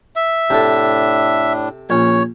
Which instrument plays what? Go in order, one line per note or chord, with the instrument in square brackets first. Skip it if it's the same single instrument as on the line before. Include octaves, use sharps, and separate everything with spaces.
[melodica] E5
[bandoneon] A2 D4 [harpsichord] C3 A4
[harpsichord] A#1 C#4 [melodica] C#5